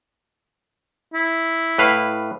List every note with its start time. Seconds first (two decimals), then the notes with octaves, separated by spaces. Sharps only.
1.14 E4
1.78 A2 B4 F5